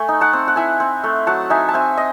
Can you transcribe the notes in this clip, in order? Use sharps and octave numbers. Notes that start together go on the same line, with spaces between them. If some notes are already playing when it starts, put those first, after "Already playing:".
Already playing: A3 G#5
D#4
F#5 A5
C4
F#5
E4 E5 G#5
C4
A3
F#3 F#5 A5
D#4 E5 G#5
A5
C4 E5 G#5
D#5